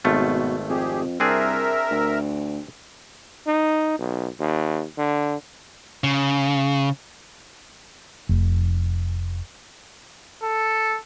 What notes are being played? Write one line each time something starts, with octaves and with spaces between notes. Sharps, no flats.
G#1 B2 A3 F4
F2 G4 G#4
C2 C4 D4 G#4 A#4 E5
D2
D#4
B1
D#2
D3
C#3
F1
A4